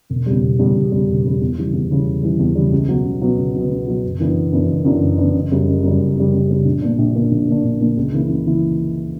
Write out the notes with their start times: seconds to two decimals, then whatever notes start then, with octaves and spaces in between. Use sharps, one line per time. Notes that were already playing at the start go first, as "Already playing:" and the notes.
0.10 E1
0.26 E2 C#3 G3
0.42 E1
0.59 E2 C#3 G3
0.75 E1
0.92 E2 C#3 G3
1.08 E1
1.25 E2 C#3 G3
1.42 E2
1.57 C#3 E3 G3
1.74 E2
1.91 C#3 E3 G3
2.06 E2
2.23 C#3 E3 G3
2.39 E2
2.55 C#3 E3 G3
2.72 C#2
2.88 B2 F#3 B3
3.05 C#2
3.21 B2 F#3 B3
3.38 C#2
3.54 B2 F#3 B3
3.71 C#2
3.86 B2 F#3 B3
4.03 F#1
4.19 F#2 E3 B3 D4
4.36 F#1
4.52 F#2 E3 B3 D4
4.68 F#1
4.85 F#2 E3 B3 D4
5.02 F#1
5.18 F#2 E3 B3 D4
5.34 F#1
5.51 F#2 C#3 G3
5.67 F#1
5.83 F#2 C#3 G3
6.00 F#1
6.16 F#2 C#3 G3
6.32 F#1
6.49 F#2 C#3 G3
6.65 A#1
6.82 A#2 A#3 D4
6.98 A#1
7.15 A#2 A#3 D4
7.31 A#1
7.47 A#2 A#3 D4
7.64 A#1
7.80 A#2 A#3 D4
7.97 C#2
8.13 C#3 E3 A#3 E4
8.29 C#2
8.46 C#3 E3 A#3 E4